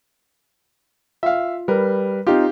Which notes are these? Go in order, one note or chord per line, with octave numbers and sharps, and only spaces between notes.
F4 E5 F5
G3 A#4 B4
C4 D#4 F4 G4 F5